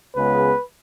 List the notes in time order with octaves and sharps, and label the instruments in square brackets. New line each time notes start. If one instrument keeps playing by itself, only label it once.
[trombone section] C#2 C#3 G#3 B3 B4